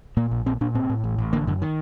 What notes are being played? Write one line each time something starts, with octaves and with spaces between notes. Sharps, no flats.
A#2 A#3
A#1
A#2 C4
A#2 D4
A2 C4
A2
A1
A1
D3 A#3
F#2 D3
D#3